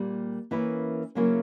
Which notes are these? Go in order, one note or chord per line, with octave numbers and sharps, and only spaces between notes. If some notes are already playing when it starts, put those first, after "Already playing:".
Already playing: A#2 G3 A#3
E3 A#3 C#4 E4 B4
C#3 F#3 A#3 C#4 E4